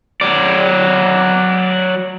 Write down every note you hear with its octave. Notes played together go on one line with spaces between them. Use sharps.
F#3 D5